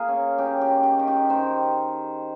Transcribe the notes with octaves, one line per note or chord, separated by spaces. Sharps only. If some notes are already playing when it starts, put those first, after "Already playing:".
Already playing: A#3 G#4 A#4
C#4
C#4 G4
G4
D#3
G4
D#3
G4
D#3 C5